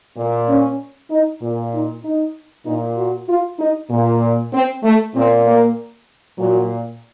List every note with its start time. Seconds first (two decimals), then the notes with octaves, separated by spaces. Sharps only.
0.17 A#2
0.49 C#4
1.11 D#4
1.42 A#2
1.73 D#4
2.04 D#4
2.66 A#2 D#4
2.97 F#4
3.29 F4
3.60 D#4
3.91 A#2
4.53 C4
4.83 A3
5.15 A#2 C4
5.46 A#3
6.39 A#2 F#3